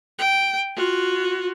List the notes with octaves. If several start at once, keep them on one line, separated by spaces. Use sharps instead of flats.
G5
F4 F#4